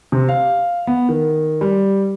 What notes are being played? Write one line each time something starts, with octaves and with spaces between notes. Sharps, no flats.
C3
F5
B3
D#3
G3